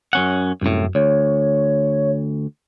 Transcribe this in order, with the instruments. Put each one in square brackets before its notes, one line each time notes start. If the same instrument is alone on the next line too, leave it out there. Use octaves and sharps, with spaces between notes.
[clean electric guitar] F#2 C#4 F#5
[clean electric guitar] C2 A2 [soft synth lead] F#2
[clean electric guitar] D2 [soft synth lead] C#5